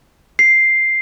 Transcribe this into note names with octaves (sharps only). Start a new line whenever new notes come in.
C7